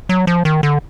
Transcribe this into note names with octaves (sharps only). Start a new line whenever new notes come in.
F#3
F3
D#3
D3